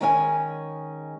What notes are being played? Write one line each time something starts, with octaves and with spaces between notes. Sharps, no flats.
D#3 G#3 C#4 G#4 E5 G#5